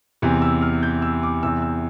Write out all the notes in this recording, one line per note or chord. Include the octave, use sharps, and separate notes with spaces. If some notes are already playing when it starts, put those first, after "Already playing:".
E2 C3 E3
E6
F6
G6
E6
D6
E2 C3 E3 E6
E6